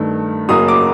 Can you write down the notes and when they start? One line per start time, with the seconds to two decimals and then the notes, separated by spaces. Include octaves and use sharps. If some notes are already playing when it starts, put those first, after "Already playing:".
Already playing: G2 D#3 A3
0.49 F#1 F#2 F#3 A#3 D#6
0.68 D6